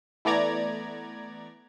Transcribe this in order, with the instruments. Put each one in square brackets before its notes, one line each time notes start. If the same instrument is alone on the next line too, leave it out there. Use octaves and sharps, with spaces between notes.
[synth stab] E3 A3 B3 D5 A#5 G#6